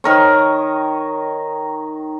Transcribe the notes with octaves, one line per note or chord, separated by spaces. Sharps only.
D#3 A#4 C#5